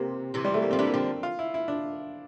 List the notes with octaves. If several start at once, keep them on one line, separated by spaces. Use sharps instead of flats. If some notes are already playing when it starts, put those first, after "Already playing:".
Already playing: C3 A#3
C3 E3
G3
A3
A#3
F3 C4
E3 G3 D4
A#3
D3 F3 C4
F4
E4
E4
D4